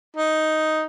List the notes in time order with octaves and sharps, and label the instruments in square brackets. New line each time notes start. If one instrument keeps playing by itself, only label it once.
[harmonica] D#4